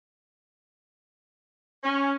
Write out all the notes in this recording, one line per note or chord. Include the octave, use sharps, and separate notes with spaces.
C#4